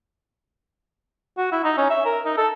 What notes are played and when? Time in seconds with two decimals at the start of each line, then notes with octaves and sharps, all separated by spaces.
1.38 F#4
1.52 E4
1.64 D#4
1.78 C#4
1.90 E5
2.05 A#4
2.25 D#4
2.38 A4